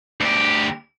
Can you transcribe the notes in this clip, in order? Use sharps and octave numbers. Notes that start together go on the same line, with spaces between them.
D2 G4